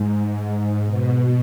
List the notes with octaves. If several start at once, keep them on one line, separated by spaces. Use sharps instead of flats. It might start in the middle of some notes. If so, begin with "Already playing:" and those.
Already playing: G#2
B2